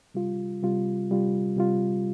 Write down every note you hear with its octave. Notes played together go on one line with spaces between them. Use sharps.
C3 G3 F4
C3 G3 F4
C3 G3 F4
C3 G3 F4